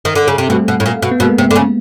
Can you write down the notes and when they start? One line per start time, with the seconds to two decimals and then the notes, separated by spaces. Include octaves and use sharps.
0.05 D#3
0.15 D3
0.28 C#3
0.38 C3
0.49 B2 G3 A3
0.68 B2
0.80 A2
0.86 A#2
1.02 B2
1.11 B3
1.20 B2 G#3 A#3
1.38 C3
1.51 D3
1.56 C#3